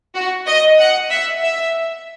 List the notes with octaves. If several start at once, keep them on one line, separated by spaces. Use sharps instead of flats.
F#4
D#5
F#5
E5
E5